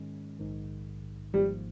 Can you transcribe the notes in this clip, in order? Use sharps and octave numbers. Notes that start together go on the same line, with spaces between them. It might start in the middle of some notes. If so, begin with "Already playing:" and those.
Already playing: G#2 D#3 G#3 C#4
A#1 G#2 D#3
G#1 G#2 F3 G3 A#3